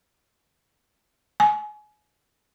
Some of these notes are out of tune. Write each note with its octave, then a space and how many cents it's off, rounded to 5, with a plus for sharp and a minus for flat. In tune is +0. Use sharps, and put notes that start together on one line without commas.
G#5 +25